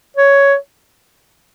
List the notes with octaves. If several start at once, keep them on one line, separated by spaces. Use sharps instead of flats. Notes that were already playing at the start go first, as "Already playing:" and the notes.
C#5